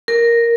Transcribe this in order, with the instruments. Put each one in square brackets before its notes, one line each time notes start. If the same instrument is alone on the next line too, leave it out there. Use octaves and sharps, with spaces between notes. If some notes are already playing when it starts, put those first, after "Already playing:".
[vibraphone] A#4